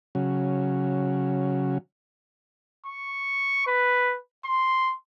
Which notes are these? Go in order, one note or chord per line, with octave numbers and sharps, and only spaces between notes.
C#3 F#3
C#6
B4
C6